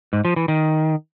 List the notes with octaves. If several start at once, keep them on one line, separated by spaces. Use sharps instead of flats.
G#2
F3
E3
D#3